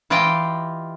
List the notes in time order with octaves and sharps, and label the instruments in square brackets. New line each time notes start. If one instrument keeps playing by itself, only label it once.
[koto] E3 F4 G4 D#5 F5 G5